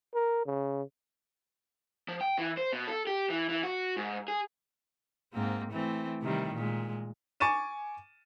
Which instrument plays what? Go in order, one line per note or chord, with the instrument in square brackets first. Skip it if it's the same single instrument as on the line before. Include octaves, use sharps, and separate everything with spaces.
[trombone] A#4
C#3
[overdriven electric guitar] F3
G5
E3
C5
B2
A4
G4
E3
E3
F#4
G#2
G#4
[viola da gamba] G#2 A#3 C4
E3 A3 C4
C3 D#3 G3
A#2 G#3
[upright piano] G#5 C#6 D6 A6 D#7 E7